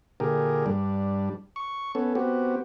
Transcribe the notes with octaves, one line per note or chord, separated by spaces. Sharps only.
A#2 D3 G4 G#4 A#4
G2 G3 D4
C#6
B3 C#4 A4
B3 C4 F#4 G4